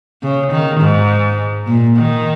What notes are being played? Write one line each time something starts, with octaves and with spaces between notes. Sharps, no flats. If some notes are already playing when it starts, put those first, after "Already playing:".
C#3
D#3
G#2
A#2
D#3